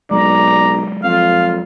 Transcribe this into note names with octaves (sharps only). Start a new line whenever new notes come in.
B1 F#3 G#3 D5 A#5
F2 F4 F5